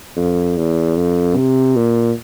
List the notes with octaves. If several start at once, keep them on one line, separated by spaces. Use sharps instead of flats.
F2
E2
F2
C3
A#2